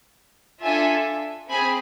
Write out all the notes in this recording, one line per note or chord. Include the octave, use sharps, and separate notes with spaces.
D4 F4 A4 E5 G#5
C4 G#4 G#5 B5